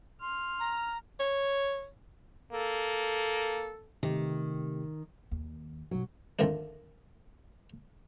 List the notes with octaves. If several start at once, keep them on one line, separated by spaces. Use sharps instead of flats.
C6 F6
A#5
C#5
A#3 A4
C3 D#3 A3 G4
D#2
B1 F#2 F#3
F2 D3 D#3 F3 A3 D4